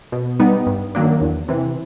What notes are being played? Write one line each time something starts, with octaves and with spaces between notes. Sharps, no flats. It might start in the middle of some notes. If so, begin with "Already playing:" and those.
B2
G3 B3 D#4
G2
D#3 F#3 A#3 D4
E2
C3 E3